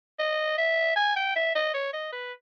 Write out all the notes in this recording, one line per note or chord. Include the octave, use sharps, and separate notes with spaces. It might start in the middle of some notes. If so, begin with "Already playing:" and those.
D#5
E5
G#5
G5
E5
D#5
C#5
D#5
B4